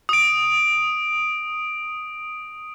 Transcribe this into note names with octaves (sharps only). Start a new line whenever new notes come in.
D#6 D7